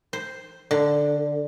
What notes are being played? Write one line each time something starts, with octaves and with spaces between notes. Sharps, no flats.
C5
D3